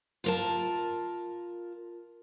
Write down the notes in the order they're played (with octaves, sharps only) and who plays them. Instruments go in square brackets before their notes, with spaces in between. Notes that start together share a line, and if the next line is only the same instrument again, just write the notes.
[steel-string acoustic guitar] F4 A#4 A5